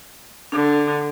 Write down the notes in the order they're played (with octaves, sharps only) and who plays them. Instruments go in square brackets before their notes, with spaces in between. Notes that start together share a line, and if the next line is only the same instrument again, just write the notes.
[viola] D3 [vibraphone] D4